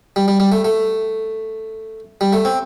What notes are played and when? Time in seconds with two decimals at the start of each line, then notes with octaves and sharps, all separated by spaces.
0.16 G3
0.28 G3
0.40 G3
0.52 A3
0.65 A3
2.21 G3
2.33 A3
2.45 C4